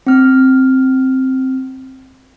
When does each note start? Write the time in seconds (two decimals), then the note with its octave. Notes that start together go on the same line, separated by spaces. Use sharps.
0.07 C4 F6